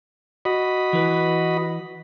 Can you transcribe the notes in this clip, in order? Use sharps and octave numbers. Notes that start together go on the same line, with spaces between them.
F#4 D#5 B5
E3 B4